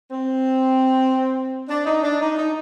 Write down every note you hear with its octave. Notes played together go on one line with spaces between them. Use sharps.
C4
D4
D#4
D4
D#4
D#4